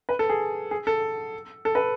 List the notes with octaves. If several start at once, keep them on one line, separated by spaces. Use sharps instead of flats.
B4
A4
G#4
G#4
A4
A4
B4